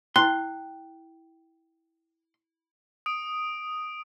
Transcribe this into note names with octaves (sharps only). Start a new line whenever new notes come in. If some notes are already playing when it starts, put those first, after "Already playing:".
E4 G5 C6 F#6
D#6 D7